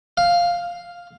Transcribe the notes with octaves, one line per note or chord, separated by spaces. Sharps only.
F5